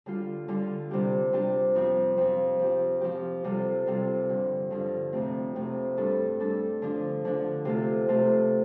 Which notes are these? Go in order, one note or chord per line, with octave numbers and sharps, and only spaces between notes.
D3 G3 F4
D3 G3 F4
C3 G3 D4 G4
C3 G3 D4 G4
F2 F3 C4
F2 F3 C4
F3 C4 G4
F3 C4 G4
C3 G3 C4 F4 A4
C3 G3 C4 F4 A4
G2 D3 F3
G2 D3 F3
F2 C3 A3 C4
F2 C3 A3 C4
G2 G3 D4 A4
G2 G3 D4 A4
D3 F3 D4
D3 F3 D4
C3 A3 F4 A4
C3 A3 F4 A4